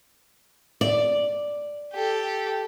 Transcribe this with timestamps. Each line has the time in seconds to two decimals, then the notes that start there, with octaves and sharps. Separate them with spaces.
0.81 D5
1.93 G4 A4